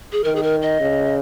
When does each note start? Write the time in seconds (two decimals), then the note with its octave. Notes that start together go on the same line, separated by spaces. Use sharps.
0.13 G#4
0.24 D#3 A#4
0.36 G#4
0.43 A#4
0.62 D#5
0.81 C#3